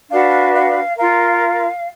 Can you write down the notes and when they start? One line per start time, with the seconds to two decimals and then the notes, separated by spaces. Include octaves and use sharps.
0.09 D4 F#4 B4 F5
0.53 F5
0.96 F4 A#4 F5